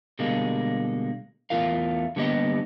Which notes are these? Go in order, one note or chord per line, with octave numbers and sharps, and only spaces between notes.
B2 D3 G3 G#3 A#3
E2 A3 F4 A#4 F5
D3 G3 A#3 B3 G4 D#5